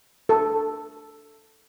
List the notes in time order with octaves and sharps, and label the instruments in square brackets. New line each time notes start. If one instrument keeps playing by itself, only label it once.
[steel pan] A4